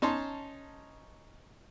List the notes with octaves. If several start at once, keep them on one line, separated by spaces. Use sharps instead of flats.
C#4 D#4 A5 C6